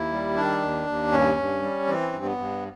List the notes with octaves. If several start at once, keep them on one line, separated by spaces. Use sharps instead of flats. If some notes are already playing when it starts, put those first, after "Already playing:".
Already playing: D#2 E4
G3
D#3 D4
D#2
D#2
G2 C#4
G2
G3
E3 C4
G2
B3
G2